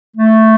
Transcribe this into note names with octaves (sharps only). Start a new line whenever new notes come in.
A3